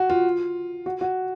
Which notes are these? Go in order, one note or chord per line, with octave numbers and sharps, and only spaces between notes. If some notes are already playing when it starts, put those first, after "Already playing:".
Already playing: F#4
F4
F#4
F#4